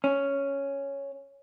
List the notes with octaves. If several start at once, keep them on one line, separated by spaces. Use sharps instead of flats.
C#4